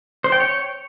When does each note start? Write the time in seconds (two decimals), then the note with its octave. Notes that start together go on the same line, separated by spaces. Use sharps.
0.24 C5
0.32 G5
0.40 C#5